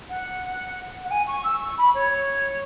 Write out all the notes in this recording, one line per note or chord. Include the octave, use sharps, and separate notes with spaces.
F#5
F#5
G#5
C#6
E6
C#6
B5
C#5